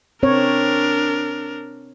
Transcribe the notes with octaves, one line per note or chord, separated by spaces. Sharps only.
C4 D4 A#4 C#5